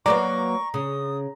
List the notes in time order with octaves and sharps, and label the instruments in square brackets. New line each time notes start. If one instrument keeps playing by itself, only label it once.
[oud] F#3 A#3 B3 [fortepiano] D5 [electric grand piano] A#5 [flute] C#6
[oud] C#3 [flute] D#6